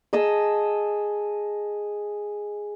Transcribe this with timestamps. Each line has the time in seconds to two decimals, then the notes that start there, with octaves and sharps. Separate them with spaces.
0.13 G#4 D#5 A5 E6